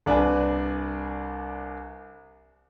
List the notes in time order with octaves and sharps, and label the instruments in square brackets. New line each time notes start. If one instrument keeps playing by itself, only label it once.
[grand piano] C2 D4 B4 G#5